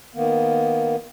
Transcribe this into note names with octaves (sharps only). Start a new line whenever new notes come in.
D#3 A#3 B3